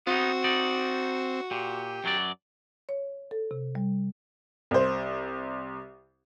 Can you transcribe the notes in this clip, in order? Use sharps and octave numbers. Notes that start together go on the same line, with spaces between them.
B3 C4 D#4 F#4
D#4 D5
A#2 G4
F#2 F#3 D5
C#5
A4
C3
G3
C2 C5